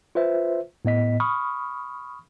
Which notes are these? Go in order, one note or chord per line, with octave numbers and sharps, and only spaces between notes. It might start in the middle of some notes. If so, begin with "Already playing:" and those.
F4 B4 C5 E5
A2 B3 D#5 B6
B5 C#6 D#6 F6